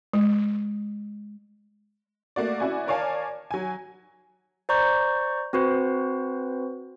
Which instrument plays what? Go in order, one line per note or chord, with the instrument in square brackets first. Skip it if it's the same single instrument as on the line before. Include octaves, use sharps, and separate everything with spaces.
[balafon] G#3
[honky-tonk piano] A3 A#3 F#4 D5
C#4 E4 F#4 D5 G#5
A#4 C#5 D5 F5 G#5 A5
F#3 G#5
[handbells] C5 D5 A#5 C#6 G6
C4 F#4 B4 C5